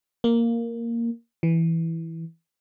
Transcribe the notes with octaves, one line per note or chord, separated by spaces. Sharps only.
A#3
E3